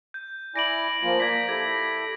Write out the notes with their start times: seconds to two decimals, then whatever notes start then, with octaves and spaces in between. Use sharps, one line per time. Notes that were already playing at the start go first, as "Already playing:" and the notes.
0.14 G6
0.56 E4 D5 G#5 A#6 D7 F#7
1.03 F3 A#3 F4 D7
1.20 A#3 D5 G#6 A#6 B6
1.49 E4 G4 A4 G#6